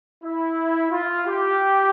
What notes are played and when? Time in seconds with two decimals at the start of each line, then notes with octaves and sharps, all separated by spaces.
0.24 E4
0.92 F4
1.27 G4